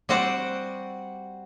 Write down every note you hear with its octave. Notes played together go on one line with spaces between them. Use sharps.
G3 C4 F#4 C5 D5 F#5